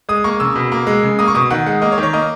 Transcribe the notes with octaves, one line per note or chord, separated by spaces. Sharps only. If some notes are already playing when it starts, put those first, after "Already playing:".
G#3 D#6
A#3 C#6
C#3 E6
B2
A#3
G#3
C#3
A#3 D#6
C#6
B2 D#6
D#3 F#5
G#3 F#5
A#3 D#5
C#5
D#3
C#5
A#3 D#5